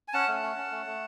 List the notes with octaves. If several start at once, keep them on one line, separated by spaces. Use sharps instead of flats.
G#5
C#4 F#5 A5
A3
C#4
C#4
A3
A3